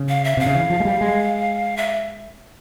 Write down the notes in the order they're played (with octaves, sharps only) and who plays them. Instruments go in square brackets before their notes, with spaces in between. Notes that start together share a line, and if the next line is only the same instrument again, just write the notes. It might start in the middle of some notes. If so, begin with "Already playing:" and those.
Already playing: [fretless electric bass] C#3
[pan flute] F5
E5
[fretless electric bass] C3 [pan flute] F5
[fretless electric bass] C#3
E3
F3
G#3
G3
G#3
[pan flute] E5